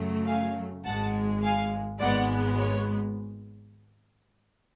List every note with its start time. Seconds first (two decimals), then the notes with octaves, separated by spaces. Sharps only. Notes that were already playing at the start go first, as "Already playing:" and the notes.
Already playing: F#2 C#3 F#3 A3
0.27 F5 G#5
0.84 G#1 G#2 G#3 F#5 A5
1.42 F5 G#5
2.00 G#1 G#2 G#3 B3 D5 F#5
2.58 C#5